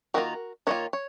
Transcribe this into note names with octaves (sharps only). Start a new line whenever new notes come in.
D#3 A#3 F4 F#4 A#4
D#3 A#3 F4 A#4 C#5
C#5